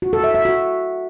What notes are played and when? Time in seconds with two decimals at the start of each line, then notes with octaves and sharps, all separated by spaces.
0.02 F#4
0.13 A4
0.24 E5
0.34 E5
0.45 F#4